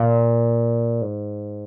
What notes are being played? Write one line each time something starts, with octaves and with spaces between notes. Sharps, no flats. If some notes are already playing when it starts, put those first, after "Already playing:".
Already playing: A#2
G#2